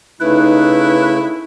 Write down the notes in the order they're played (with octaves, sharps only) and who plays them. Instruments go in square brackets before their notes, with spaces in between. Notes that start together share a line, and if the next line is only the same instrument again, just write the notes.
[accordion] C#3 A3 [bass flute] D#4 [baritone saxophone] E4 [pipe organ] B4